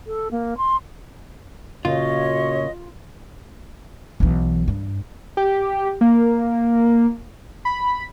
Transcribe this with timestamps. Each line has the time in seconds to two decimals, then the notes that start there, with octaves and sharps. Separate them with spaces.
0.07 A4
0.31 A#3
0.57 C6
1.85 A#2 C#3 A#3 F4 F#4 C#5 D#5
4.20 B1 E3
4.68 G2
5.37 G4
6.01 A#3
7.65 B5